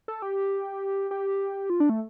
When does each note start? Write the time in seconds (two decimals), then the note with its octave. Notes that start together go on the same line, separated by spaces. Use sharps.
0.08 A4
0.22 G4
1.11 G4
1.70 F4
1.80 D4
1.90 A3